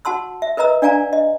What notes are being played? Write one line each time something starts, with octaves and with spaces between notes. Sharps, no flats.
F#4 F#5 A5 C6 E6
E5
A#4 B4 D#5 A#5 E6
D4 D5 F5 G#5 A#5
D#5